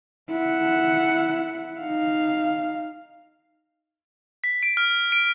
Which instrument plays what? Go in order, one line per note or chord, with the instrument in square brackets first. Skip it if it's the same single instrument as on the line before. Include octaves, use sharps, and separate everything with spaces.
[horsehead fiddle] E4 F#5
D#4 F5
[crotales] B6
D7
F6
D7